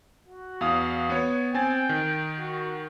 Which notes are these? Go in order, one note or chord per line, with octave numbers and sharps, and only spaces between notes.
F#4
E2 F5 D#6
B3 C#5
C4 G5 G#5 A6
D#3
F#4